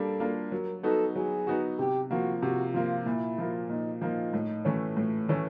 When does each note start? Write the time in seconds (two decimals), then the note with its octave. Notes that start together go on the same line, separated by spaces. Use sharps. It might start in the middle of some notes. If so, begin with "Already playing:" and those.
Already playing: G3 A#3 D4 A4
0.20 A#3 D4 F4
0.52 F#3 A#4
0.83 B3 D#4 F#4 A4
1.15 F#3 G#4
1.47 B3 D#4 F#4
1.79 C3 G4
2.11 F3 A#3 F#4
2.42 C3 F#4
2.74 F3 A#3 F4
3.06 A#2 E4
3.38 F3 A#3
3.70 A#2 D#4
4.02 F3 A#3 D#4
4.33 A2
4.65 E3 A3 C#4
4.97 A2
5.29 E3 A3 C#4